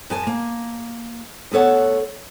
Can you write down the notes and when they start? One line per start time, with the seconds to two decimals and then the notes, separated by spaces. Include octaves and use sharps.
0.10 F#2 G#5 A5
0.27 A#3
1.52 D2 B3 A4 C#5 F#5